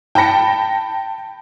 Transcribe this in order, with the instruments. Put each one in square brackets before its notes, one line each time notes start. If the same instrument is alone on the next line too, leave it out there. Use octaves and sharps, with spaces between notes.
[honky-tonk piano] G5 A5 B5 A#6 C#7